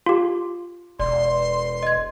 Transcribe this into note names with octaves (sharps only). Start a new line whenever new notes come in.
F4 G4
E1 D5 C6
D#5 G#6